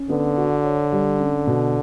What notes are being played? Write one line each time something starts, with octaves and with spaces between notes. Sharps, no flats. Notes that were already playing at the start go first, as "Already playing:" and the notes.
Already playing: C#4
D3 B3
F#4
C#5
G3
C#4
B2